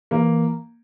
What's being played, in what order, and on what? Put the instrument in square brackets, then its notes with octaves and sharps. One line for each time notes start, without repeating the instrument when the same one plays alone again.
[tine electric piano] E3 [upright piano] A#3